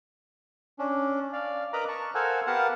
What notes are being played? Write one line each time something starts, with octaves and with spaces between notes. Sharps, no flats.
C#4 D4
D5 F5
A#4 B4 D#5 A#5 B5 D6
A5 C#6
A4 A#4 C5 F5 F#5 G#5
B3 G4 A#4 F5 F#5 A5